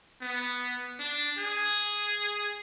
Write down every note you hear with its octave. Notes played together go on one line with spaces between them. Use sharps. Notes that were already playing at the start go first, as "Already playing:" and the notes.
B3
D4
G#4